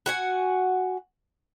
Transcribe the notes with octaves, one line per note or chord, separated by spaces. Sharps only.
F#4 F#5 G#5